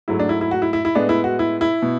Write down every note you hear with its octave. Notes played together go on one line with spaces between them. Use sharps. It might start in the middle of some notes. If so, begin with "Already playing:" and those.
G#2 F#3 A3 E4
D4
E4
E4
F#4
E4
E4
E4
A2 G#3 B3 D4
E4
F#4
E4
E4
B2